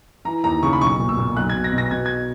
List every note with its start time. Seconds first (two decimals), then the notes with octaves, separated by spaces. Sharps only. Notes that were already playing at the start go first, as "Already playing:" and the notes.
0.25 E3 A#5
0.44 D#2 A#5
0.63 C#3 C#6
0.73 B5
0.81 B1 C#6
0.99 A#2
1.09 E6
1.17 A#2
1.36 B1 F#6
1.50 G#6
1.54 B2
1.64 A#6
1.73 B2
1.78 A#6
1.91 B2 G#6
2.06 G#6